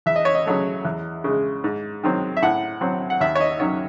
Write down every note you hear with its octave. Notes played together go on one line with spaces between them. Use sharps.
E2 E5
D#5
C#5
D#5
C#3 F#3 A3
E2
C#3 G#3
G#2
D#3 F#3 C4
E5
A2 F#5
F#3 C4
F#5
D#2 E5
C#5
D#5
D#3 F#3 C#4 C#5